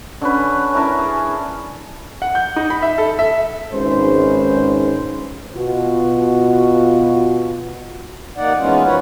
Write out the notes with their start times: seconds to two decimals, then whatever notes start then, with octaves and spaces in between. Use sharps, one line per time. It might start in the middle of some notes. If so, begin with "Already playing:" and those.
0.21 D3 C#4 B4
0.73 C#4 E4 A#4 A5
0.99 G#4
2.22 F#5
2.35 G6
2.56 D#4
2.70 B5
2.82 E5
2.98 A4
3.19 E5
3.72 G#1 G#2 C#4 B4 C5
5.56 B2 F4 F#4
8.37 D#2 A#3 D#4 D5 F#5
8.58 E3 G#3 B3 C#4 D#4 F4
8.84 F#2 F3 F#4 B4 C#5 F#5